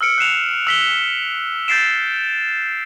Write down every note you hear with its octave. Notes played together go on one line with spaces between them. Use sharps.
E6 F6 C#7 D7
F#6 C7 E7 F7
E6 B6 G7
G6 A6 B6 C7 D7 E7